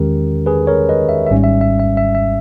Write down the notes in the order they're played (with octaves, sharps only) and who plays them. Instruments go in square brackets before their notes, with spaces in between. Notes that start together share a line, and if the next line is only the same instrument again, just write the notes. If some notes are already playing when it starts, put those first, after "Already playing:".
Already playing: [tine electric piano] E2 D#3 G#3 C#4 G4 A#4
G#4 B4
A#4 C#5
B4 D#5
E5
E5
G#1 G#2 G3 C#4
E5
E5
E5
E5
E5